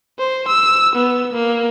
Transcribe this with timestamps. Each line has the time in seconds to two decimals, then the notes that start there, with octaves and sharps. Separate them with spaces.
0.18 C5
0.48 E6
0.95 B3
1.33 A#3